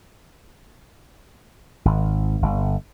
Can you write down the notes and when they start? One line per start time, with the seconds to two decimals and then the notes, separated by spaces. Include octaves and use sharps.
1.85 G#1
2.42 G1